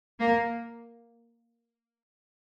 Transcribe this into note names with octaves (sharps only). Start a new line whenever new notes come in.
A#3